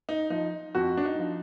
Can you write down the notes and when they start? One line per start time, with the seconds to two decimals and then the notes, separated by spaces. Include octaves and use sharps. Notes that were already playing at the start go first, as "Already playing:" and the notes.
0.09 D#4
0.30 F3 D#4
0.75 F2 F#4
0.97 D4
1.05 D#4
1.19 F3